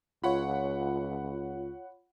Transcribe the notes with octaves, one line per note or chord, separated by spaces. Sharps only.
C#2 F4 C#5 F#5 B5